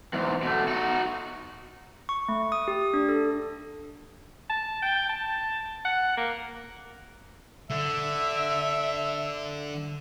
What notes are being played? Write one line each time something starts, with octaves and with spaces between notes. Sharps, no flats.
E2 G#2
B2 A3
D#4 F#4
C#6
A3
D#6
G4
D4
A4
A5
G5
A5
F#5
A#3
D3 E5